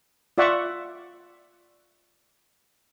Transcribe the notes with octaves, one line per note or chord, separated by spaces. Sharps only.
F4 D5 E5 F#5 C#6